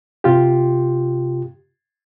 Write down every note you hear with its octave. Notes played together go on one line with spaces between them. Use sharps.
C3 F4 G4